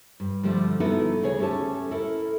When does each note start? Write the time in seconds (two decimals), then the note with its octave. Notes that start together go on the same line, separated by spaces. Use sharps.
0.20 G2
0.43 D3 F3 G3 A3
0.80 B3 D#4 E4 F#4 A4 B4
1.23 D2 C#3 G#4 C#5
1.39 A3 C#4 G4 A4 A5
1.91 E4 A4 A#4